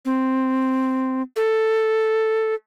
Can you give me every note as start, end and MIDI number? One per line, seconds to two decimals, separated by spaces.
0.05 1.22 60
1.36 2.54 69